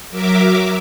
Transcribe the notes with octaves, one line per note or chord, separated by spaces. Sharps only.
F#3 A#4 E5 D6